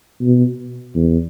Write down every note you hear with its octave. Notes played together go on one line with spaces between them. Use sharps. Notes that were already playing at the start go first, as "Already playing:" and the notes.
B2
E2